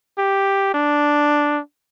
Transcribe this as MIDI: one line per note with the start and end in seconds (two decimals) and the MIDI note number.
0.18 0.71 67
0.74 1.60 62